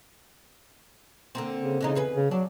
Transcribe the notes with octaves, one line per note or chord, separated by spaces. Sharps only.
D3 A#3 C4
C#3
C#3 E3 G#3 D#4
E2 G#4 B4
C#3
F#3 D4